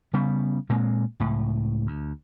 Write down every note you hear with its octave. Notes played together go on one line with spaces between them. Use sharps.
C#3 G3 B3
A#2 G#3 A#3 C4
C#2 A2
D2